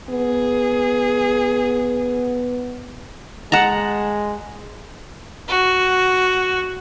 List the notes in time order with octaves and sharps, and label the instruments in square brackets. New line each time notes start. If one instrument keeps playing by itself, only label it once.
[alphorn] B3 [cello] G#4
[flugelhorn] G#3 [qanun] F#5 A5 A#5
[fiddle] F#4